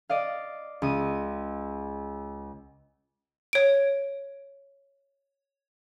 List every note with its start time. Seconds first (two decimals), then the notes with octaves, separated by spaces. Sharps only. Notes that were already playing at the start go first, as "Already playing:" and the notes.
0.09 D5 D#5 F5
0.82 C#2 D#6 D#7
3.53 C#5 D7